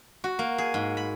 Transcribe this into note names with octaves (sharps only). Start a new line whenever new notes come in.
F#4
A#3
G#4
G#2
B5